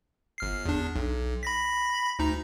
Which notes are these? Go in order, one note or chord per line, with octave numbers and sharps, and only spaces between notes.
G1 F6 C7
E2 D4
B1
B5 A#6 B6
D2 D#4 A#5